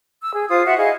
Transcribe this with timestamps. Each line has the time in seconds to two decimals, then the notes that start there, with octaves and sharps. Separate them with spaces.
0.23 E6
0.34 G#4
0.49 F4 C5 D#6
0.65 F#4 E5 F#5
0.77 E4 G#4 D#5 F5